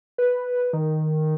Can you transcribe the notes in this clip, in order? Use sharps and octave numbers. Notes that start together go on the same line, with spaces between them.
B4
D#3